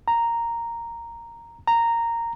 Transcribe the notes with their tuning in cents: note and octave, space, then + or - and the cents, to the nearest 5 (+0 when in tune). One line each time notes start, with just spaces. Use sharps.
A#5 -5
A#5 -10